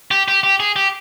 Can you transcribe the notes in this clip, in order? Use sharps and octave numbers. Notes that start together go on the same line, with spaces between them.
G4
G4
G4
G#4
G4